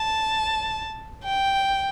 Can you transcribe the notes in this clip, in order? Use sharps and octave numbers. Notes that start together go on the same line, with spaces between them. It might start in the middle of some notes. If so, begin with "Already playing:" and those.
Already playing: A5
G5